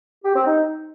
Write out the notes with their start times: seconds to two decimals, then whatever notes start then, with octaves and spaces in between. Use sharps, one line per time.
0.24 G4
0.35 C4
0.46 D#4